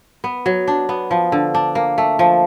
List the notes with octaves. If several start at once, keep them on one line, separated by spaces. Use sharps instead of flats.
B3
F#3
D4
B3
F3
D3
D4
A#3
A3
F3